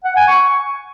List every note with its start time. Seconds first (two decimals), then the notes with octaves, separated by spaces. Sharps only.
0.04 F#5
0.16 G#5
0.28 C#6